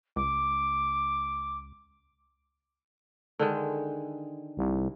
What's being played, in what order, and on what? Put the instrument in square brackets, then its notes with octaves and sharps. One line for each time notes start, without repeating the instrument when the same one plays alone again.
[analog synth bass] C#2 [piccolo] D6
[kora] D3 D#3 G#3
[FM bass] C2